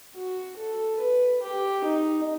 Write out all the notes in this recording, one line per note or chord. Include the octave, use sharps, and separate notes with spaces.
F#4
A4
B4
G4
D#4